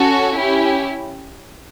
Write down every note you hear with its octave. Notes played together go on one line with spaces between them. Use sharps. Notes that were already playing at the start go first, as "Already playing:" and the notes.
Already playing: C#4 F#4 A4
C#4 E4 G4